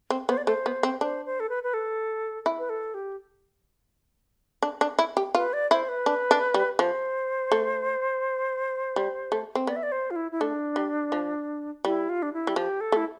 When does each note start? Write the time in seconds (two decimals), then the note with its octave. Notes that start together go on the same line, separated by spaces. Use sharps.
0.10 C4
0.28 B3 C5
0.37 D5
0.45 A3 C5
0.66 B3
0.83 C4
1.01 D4 C5
1.25 C5
1.40 A4
1.50 B4
1.63 B4
1.74 A4
2.46 E4
2.59 B4
2.69 A4
2.94 G4
4.62 D4
4.81 D4
4.99 E4
5.17 G4
5.35 F4 B4
5.53 D5
5.71 E4 C5
5.89 B4
6.06 D4
6.31 D4
6.54 G3
6.79 F3 C5
7.52 A3
8.96 G3
9.32 A3
9.55 C4
9.67 B3 D5
9.76 E5
9.83 D5
9.92 C5
10.11 F4
10.16 E4
10.32 E4
10.41 A3 D4
10.76 G3
11.12 F3
11.85 G3 E4
12.09 F4
12.22 D4
12.33 E4
12.47 G3
12.56 F3 G4
12.81 A4
12.92 A3 E4